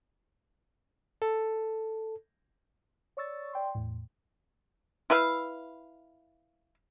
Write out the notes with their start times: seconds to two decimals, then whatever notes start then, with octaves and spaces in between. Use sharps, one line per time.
1.22 A4
3.17 C#5 D5 C#6 E6 A6
3.53 D5 G5 C6
3.75 E2 A2
5.10 E4 B4 E5 F5